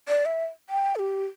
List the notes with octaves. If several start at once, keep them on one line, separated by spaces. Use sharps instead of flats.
D5
E5
G5
A4
G4